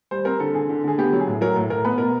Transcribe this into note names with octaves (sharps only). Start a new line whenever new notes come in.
G3 C5
C4 A#4
D3 A4
D3 G#4
D3
D3 G#4
B3 G4
F#3
G#4
A2
F#3 A#4
A2
A2 A#4
B3 B4
B2 A#4